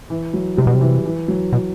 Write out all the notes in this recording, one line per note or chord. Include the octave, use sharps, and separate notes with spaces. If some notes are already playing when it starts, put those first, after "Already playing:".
E3
F#3
C3 G3
B2
C3
E3
E3
F#3
B2